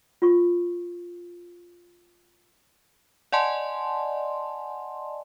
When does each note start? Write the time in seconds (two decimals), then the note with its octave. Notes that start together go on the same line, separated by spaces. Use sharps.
0.22 F4 C#6
3.32 D5 D#5 F#5 G#5 A5 C6